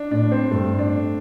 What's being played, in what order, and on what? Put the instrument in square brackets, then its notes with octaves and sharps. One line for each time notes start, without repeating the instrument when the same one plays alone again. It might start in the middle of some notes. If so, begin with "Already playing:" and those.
Already playing: [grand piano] D4
[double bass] A2 [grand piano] D4
[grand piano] C4
[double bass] G2 [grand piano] A3
[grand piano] D4